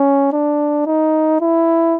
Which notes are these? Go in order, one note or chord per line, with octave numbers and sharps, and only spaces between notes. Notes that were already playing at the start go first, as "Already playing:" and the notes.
Already playing: C#4
D4
D#4
E4